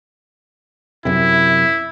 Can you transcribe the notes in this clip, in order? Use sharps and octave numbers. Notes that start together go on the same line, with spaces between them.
F#2 C3 E4